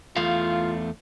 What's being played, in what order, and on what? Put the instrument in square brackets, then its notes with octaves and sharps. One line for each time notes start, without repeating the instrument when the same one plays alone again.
[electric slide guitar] E2 A3 F5 [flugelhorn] F4